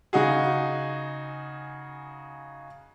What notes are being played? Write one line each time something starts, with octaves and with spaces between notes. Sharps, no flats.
C#3 D#4 F#4 G#4